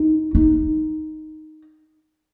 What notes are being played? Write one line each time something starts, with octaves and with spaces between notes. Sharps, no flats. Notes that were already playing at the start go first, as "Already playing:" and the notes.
Already playing: D#4
D#4